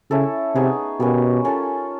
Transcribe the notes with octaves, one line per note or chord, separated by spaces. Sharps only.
C#3 C#4 E4 A4
C3 B3 D#4 G#4 C#5
B2 G3 A#3 C#4
C#4 F4 A4